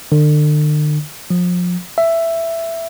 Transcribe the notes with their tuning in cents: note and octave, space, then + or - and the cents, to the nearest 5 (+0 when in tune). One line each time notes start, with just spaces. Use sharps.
D3 +40
F3 +30
E5 +10